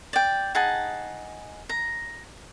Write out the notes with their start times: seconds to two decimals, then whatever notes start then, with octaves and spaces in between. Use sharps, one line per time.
0.13 D5 G5
0.55 D#4 G#4 F#5 A5
1.69 A#5